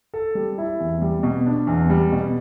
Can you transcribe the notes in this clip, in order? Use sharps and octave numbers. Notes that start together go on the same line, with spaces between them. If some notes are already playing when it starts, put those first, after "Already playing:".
A4
G3
E4
E2
G3
B2
D4
E2
G3
B2